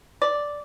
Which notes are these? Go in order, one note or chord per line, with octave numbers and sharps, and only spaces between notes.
D5